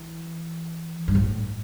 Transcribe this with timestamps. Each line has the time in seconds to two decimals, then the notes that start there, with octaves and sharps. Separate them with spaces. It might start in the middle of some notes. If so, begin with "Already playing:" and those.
Already playing: E3
1.08 G2
1.15 A2